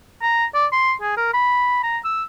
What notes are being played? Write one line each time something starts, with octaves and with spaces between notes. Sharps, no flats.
A#5
D5
C6
G#4
A#4
B5
A#5
E6